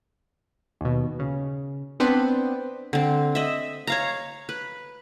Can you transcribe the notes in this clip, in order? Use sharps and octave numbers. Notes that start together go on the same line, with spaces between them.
D#2 B2
C#3
B3 C4 D4 B4 C5
D3 C4
D#5 E5
C#5 F5 A#5
B4